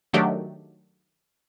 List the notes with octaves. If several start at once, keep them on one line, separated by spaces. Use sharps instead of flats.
D#3 F#3 A3 D4 G4